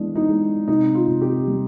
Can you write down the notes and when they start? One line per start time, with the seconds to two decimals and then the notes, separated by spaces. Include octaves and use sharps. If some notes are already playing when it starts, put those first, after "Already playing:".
Already playing: E3 G#3 B3 D4
0.16 D#4
0.29 G#3
0.68 C3 D#4
0.95 F4
1.08 C3
1.21 G4
1.47 G3